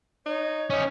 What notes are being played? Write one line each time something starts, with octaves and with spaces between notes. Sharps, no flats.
D#4 C#5
C#4 D#4